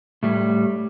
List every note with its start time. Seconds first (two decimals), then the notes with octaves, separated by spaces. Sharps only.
0.23 A2 G3